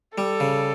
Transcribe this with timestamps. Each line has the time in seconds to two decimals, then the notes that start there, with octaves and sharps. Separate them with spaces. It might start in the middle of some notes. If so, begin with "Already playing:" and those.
0.17 G3 A4
0.40 C#3